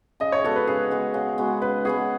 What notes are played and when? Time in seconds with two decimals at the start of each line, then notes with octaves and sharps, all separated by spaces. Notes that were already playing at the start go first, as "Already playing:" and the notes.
0.20 C#3 D#5
0.32 C#5
0.44 G#3 B3 F#4 A4
0.56 B4
0.67 C#3 G#4
0.91 G#3 B3 F#4
1.14 C#3
1.38 G#3 B3 F#4
1.62 C#3 B4
1.85 G#3 B3 F#4 G#4